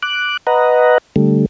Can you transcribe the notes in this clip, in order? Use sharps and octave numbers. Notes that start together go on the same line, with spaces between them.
D6 F#6
B4 D#5 F#5 A#5
D3 G3 A3